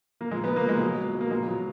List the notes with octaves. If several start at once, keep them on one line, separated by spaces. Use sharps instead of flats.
A#3
A#2 G#3
B3
A#2
A#3
A#2 G#3
B2 F#3
B2
B2
A#3
A#2 G#3
A#2 F#3